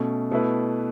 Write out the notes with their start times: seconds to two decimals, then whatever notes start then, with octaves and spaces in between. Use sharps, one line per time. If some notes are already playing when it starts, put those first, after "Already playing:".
Already playing: B2 A3 C#4
0.31 B2 A3 E4 B4